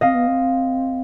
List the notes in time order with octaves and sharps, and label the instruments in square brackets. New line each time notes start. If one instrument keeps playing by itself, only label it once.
[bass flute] C4 [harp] D#5 F5
[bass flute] B3
C4